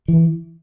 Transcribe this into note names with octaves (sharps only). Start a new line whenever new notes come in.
E3